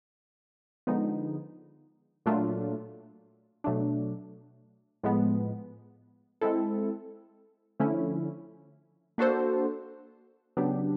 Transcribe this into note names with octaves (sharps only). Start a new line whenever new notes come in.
D3 F3 G#3 B3 D#4
A#2 F#3 A3 D4 F4
B2 F#3 A3 D4
A2 F3 G#3 B3
G#3 C4 E4 A4
D3 F3 A3 C#4 E4
A#3 D4 F#4 A4 C5
C#3 F#3 B3 D4 G4